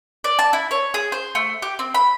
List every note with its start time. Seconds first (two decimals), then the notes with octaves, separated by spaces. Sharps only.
0.24 D5
0.39 A5
0.53 E4
0.71 C#5
0.94 G#4
1.12 C5
1.35 A3
1.62 G4
1.79 C4
1.94 B5